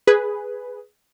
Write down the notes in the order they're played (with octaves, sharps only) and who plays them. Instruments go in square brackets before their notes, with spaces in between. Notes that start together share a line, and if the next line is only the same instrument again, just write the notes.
[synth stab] G#4 B4